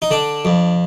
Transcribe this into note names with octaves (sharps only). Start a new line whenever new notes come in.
D#4
D3 D4
F2